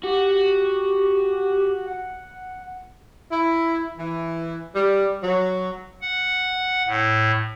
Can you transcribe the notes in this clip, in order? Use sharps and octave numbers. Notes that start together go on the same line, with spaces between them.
F#4 G4
F#5
E4
E3
G3
F#3
F#5
A2